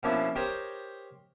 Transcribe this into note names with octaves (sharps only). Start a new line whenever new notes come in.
B2 F3 A#3 C#4 D4 E4
G4 A#4 C5 C#5 D#5 A#5